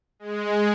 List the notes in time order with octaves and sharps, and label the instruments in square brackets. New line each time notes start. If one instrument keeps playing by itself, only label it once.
[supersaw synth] G#3